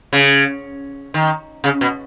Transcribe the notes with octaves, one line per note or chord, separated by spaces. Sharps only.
C#3
D#3
C#3
B2